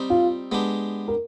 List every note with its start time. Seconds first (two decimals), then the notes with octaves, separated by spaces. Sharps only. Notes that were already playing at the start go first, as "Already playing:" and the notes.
Already playing: G3 C4 D#4
0.10 F4
0.52 G#3 B3 D4 G4
1.08 A#4